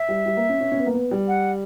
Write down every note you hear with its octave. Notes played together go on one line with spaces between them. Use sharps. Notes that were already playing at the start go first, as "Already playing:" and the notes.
Already playing: E5
G3
G3
A#3
C#4
C#4
C#4
B3
A#3
B3
G3
F#5